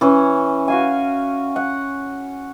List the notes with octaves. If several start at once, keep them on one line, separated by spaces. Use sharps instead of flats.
E3 C#4
F#4 F5 G#5
F#5